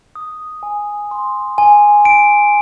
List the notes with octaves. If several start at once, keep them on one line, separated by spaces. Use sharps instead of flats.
D#6
G#5
C6
G#5
D7